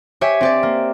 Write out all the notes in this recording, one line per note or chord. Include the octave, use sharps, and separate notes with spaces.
G4 C#5 E5 G#5
C4 G4 D5
A#3